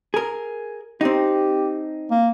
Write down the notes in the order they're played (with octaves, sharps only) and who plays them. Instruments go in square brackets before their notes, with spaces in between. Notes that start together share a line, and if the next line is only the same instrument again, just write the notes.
[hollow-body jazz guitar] G#4 A#4
[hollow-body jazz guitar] C4 D#4 [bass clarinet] G4
[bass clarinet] A#3